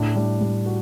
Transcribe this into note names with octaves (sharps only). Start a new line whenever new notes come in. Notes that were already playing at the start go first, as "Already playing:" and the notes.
Already playing: A2 D4
G3
G3
F#4